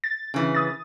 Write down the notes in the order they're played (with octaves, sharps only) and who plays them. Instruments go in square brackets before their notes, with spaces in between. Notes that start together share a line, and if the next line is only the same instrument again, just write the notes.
[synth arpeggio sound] A6
[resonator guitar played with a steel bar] C#3 E3
[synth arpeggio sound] D#6 A6